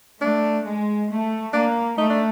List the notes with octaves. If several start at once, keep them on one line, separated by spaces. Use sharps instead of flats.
A3 D4
G#3
A3
A#3 D4
A3 D#4
D4